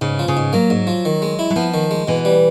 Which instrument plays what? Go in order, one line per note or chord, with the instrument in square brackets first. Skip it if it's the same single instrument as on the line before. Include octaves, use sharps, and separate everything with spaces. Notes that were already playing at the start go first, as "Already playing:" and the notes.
[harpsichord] G#2 [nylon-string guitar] C#3
[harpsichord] F3
[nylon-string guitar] C#3
[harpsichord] G#2
[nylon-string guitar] F#3 [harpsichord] A#3
[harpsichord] G#2
F3
D#3
G#3
E4
[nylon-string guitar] F#3
[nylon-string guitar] F3 [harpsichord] B3
[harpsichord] D#3
G#3
[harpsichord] B2 [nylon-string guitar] E3
[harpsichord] G3